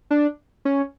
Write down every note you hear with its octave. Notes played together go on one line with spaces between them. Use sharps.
D4
C#4